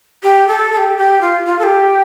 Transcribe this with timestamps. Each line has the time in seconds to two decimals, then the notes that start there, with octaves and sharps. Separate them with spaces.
0.23 G4
0.48 A4
0.72 A4
0.77 G4
0.98 G4
1.21 F4
1.46 F4
1.59 A4
1.63 G4